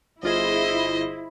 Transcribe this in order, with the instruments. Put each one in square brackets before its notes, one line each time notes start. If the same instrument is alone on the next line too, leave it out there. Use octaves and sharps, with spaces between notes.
[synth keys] G1 F4 G#4 [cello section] E4 [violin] C5 D#5